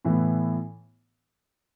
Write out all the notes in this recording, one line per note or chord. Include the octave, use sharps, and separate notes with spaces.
A2 E3 B3